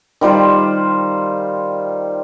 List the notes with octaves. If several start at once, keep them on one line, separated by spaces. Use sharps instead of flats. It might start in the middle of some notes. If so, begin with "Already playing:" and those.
D#3 G3 F4 C5